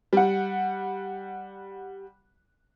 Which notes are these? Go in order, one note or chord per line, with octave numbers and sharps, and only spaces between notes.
G3 F#5